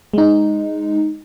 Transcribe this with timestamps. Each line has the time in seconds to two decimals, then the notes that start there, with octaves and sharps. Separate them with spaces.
0.14 G#3 D#4